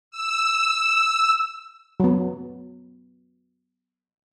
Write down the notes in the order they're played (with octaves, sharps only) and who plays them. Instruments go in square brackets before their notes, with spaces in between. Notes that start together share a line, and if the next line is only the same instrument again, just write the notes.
[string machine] E6
[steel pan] F#3 B3